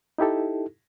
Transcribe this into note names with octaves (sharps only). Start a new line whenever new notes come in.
D#4 E4 G4 A4